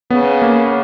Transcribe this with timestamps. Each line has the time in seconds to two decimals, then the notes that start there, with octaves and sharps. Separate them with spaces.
0.10 C#3 B3
0.42 A#3